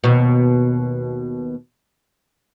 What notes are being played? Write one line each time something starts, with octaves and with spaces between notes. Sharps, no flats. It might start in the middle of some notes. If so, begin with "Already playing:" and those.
D#2 B2